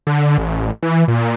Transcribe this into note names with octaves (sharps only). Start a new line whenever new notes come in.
D3
A1
E3
A#2